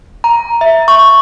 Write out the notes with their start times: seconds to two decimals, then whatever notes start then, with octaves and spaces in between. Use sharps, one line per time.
0.24 A#5
0.61 E5
0.88 C#6